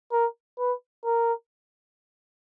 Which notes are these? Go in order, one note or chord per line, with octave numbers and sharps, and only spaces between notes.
A#4
B4
A#4